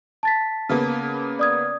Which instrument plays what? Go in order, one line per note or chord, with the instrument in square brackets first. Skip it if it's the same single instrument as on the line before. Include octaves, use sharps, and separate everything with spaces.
[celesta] A5 A6 B6
[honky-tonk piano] C#3 A#3 B3
[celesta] D5 D#6 G#6